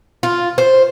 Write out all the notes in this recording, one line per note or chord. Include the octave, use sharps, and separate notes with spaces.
F4
C5